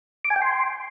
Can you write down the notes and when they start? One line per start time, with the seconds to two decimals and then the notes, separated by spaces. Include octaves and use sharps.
0.25 D6
0.30 G#5
0.36 G5
0.42 C6